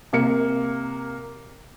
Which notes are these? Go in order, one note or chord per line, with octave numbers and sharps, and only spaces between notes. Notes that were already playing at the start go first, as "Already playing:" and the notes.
C3 A#3 C#7